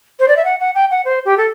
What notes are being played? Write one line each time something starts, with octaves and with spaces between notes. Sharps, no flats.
C5
D5
E5
F#5
F#5
G5
F#5
C5
G4
A4